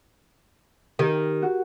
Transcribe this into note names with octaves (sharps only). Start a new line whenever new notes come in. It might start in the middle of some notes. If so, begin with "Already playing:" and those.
D#3 G4 A#4
F#4